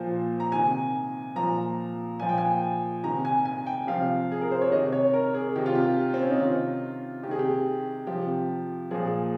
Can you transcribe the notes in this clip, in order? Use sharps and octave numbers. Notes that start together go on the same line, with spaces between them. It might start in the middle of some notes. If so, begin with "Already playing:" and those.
Already playing: A#2 F3 C5
A#5
C3 D#3 G#5
A#2 F3 A#5
A#2 F3 G#5
G5
G#5
C3 D#3 A#5
G#5
G#5
G5
C3 F3 F5
G#4
A#4
C5
C#5
C3 D#3 D#5
C#5
A#4
G#4
C3 D#3 G4
F4
G4
C4
C#4
D#4
C3 D#3 F4
C3 D#3 G4 G#4
G4
C3 F3 G4
A#2 F3 G#4